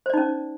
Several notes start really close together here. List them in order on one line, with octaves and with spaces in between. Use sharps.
C5 D5 D#4 C#4